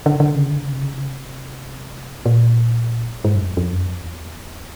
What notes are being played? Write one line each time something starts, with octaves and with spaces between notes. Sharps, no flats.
D3
D3
C#3
D3
C#3
C3
C#3
C3
C#3
C3
A#2
G#2
F#2
F2
F2
F#2
F2
E2